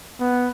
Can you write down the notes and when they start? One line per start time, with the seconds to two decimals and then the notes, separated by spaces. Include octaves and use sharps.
0.19 B3